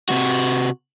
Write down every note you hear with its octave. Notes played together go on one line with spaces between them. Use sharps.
C3 F#4